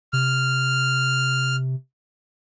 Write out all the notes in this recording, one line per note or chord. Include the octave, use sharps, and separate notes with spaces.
C3 F6